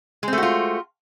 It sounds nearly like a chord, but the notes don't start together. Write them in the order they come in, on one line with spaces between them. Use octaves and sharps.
G#3 C4 A3 F#4 F4